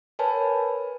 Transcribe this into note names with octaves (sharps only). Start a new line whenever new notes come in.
A#4 B4 C#5 G#5 A5 B5